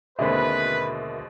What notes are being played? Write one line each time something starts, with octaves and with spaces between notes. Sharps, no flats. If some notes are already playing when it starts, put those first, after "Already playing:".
D#2 B2 D3 G#3 C4 A#4 B4 E5